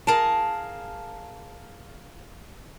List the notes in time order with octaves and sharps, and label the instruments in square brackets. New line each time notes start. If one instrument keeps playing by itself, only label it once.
[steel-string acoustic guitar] G#4 A#4 F5 A5